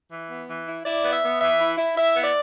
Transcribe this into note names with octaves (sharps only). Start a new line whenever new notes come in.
E3
B3
E3
E4
E4 D5
B3
E5
B3
E3 E5
E4
E4
E4 E5
B3
D5